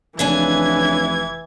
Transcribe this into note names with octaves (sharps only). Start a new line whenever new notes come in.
F1 C#3 E3 D4 G#5 G#6